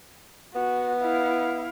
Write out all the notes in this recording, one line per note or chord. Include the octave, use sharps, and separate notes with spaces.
B3 F#4
E4 F5